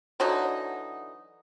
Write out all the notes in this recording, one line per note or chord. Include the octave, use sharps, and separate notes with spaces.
D3 E3 F#3 D#4